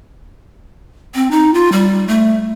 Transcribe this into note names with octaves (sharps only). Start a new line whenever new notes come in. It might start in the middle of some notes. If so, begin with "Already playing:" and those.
C4
D#4
F4
G3
A3